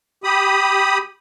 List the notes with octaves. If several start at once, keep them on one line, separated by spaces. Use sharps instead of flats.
G4 B5 D#6